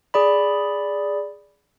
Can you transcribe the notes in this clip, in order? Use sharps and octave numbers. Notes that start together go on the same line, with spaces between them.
G#4 D5 B5